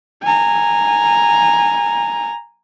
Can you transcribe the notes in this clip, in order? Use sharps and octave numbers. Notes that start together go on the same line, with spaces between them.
G#5 A#5